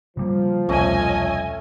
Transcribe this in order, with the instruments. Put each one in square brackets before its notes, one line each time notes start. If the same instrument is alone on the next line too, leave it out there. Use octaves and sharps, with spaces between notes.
[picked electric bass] C#3 G3 A#3 [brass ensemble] F3
[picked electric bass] E1 C2 C4 [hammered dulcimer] A3 C#4 [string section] C#5 D#5 G#5